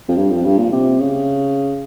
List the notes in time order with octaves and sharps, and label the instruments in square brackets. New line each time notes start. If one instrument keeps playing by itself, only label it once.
[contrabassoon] F2
G2
F2
G2
A#2
C3
C#3